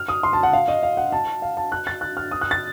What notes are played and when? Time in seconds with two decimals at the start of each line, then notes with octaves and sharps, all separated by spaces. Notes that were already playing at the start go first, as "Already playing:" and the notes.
Already playing: F6
0.09 D#6
0.23 C6
0.33 A5
0.43 F#5
0.53 F5
0.68 D#5
0.83 F5
0.97 F#5
1.12 A5
1.42 F5
1.57 A5
1.72 F#6
1.87 A6
2.01 F#6
2.17 F6
2.31 D#6
2.41 F#6
2.51 A6